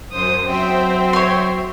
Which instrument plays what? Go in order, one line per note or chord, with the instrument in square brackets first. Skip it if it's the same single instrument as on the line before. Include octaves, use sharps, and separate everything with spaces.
[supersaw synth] F#2 C5 [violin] D#6
[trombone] F#3 [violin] C4 [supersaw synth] C5 E5 G5
[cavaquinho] C#5 C6